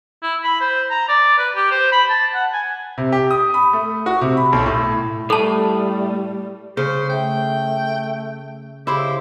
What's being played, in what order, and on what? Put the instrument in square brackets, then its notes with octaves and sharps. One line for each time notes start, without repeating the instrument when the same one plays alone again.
[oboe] E4
B5
C5
A#5
D5
B4
G4
C5
B5
A5
F#5
G#5
[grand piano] C3
G4
D#6
B5
A3
F#4
C3
B5
B1
A2
[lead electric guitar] A2 A3 [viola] G3 [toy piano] A4 A5
[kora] C#3 [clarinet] C5
[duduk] A3 [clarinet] G5
[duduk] C#3 [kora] E4 C5 [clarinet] G4